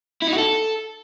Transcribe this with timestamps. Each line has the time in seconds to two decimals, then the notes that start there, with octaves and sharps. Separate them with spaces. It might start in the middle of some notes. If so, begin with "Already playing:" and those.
0.22 E4
0.28 D#4
0.33 F#4
0.38 A4